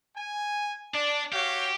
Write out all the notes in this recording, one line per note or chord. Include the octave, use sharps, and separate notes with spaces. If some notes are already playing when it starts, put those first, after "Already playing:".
G#5
D4 D5
F#4 G4 C#5 F5